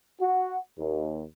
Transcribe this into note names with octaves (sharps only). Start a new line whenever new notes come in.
F#4
D#2